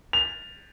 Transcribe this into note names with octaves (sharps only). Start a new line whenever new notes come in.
F7